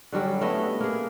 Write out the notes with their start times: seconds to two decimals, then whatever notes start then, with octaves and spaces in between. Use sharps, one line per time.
0.12 D3 F#3 G3 C#4
0.41 A3 B3 E4 D#5
0.80 A#3 G#4